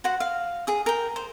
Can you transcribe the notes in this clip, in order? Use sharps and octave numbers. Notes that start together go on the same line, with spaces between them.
F#4 C5 F#5
F5
G#4 D#6
A#4 G5
C5